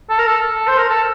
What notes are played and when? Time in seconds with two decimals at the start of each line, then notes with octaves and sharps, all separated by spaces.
0.10 A4
0.18 A#4
0.27 A4
0.67 C5
0.78 A#4
0.89 A4